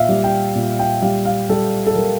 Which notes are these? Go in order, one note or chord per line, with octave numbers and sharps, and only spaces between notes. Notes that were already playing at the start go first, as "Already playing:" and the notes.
Already playing: A#2 E5 F5
G3
G5
A#2
G5
G3 F5
F5
G3 A4
A4
G3 A#4